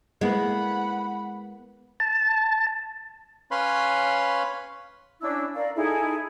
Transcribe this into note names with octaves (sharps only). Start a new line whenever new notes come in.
G#3 A#3 B3 E4 F#5 B5
A5
C#4 B4 C#5 F5 B5 C6
C#4 D4 E4 E6
A#4 D5 F5
D#4 E4 G#4 A4